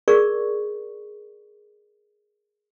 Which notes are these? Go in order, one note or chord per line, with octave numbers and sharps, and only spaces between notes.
G#4 A#4 D5 C#6